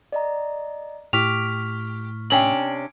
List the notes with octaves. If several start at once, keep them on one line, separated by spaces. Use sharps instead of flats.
D5 D#5 A#5
A2 G4 C#6 F6 B6 F7
C3 C#4 D4 G5 F#7